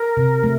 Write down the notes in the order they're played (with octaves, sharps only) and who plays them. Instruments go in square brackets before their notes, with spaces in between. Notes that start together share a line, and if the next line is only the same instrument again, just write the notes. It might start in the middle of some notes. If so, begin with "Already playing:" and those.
Already playing: [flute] A#4
[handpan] C3
A3